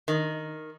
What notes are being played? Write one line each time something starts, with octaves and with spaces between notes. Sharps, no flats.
D#3